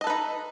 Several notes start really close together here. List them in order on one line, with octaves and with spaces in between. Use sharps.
D#5 A4 B4 D#4